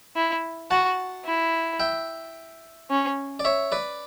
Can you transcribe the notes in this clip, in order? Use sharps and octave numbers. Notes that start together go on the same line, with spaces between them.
E4
F#4 F#5 A5
E4
E5 G5
C#4
D5
C#5 E5
B4 D5